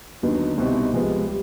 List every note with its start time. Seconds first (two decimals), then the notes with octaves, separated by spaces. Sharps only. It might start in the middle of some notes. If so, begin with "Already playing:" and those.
0.22 D#2 D3 F#3 B3 D#4
0.58 C2 B2 G3 C4 D#4
0.93 C#2 C3 F3 G#3 B3
1.27 G3